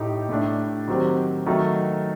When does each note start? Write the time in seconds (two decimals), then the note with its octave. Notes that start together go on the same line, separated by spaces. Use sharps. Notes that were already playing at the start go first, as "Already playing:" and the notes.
Already playing: A2 A3 D#4 G4
0.29 A2 A3 D4
0.88 D#3 F#3 C4 G4
1.46 D#3 F#3 A3 D#4